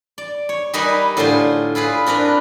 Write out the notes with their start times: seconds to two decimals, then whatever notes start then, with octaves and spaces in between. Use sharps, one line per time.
0.18 D5
0.49 C#5
0.73 G3 D#4 A#4 B4 D#5 G#5
1.17 A2 D3 F4 G#4 C5 C6
1.75 E4 F4 G#4 B4
2.06 C4 D4 A#4 B4